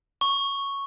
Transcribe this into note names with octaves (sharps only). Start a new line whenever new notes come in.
C#6